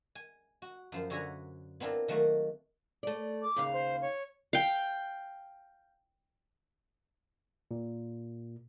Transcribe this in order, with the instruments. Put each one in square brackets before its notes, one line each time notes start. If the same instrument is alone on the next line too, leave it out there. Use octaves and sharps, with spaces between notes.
[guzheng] G#5
F#4
F#2 F3 C5
D3 F#4 C#5 E5 G#5 A#5
B3 C4 D4 E4 F4 A#4
D#3 F#3 A3 A#3 F#4
[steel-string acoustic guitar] A3 D5
[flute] D6
[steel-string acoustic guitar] D#2 C#3 F5
[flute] C5
C#5
[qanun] F5 G5
[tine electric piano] A#2